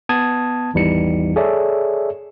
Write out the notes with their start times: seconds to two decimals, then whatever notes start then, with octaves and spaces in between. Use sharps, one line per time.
0.09 B3 A5 D#6 G#6
0.74 G#1 E2 E3 G3 D#4 C#7
1.36 G#4 A4 C#5 D5 E5